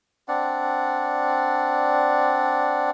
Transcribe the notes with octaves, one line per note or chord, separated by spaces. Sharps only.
C4 D4 D5 F#5